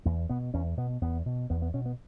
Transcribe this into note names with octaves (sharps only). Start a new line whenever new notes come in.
E2 A#3
B2 B3
E2 C#4
B2 B3
E2 B3
B2
E2 B3
B3
B2 C#4
B3